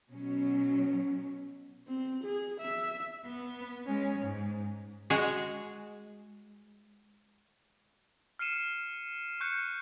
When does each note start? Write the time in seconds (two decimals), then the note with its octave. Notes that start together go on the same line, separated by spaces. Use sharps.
0.11 B2 F#3 C#4
1.87 C4
2.24 G#4
2.60 E5
3.25 B3
3.85 G#3 C#4
4.19 G#2
5.10 G#3 F#4 G#4
8.39 F6 C7 C#7 D#7 E7
9.40 C#6 F#6 G6 C#7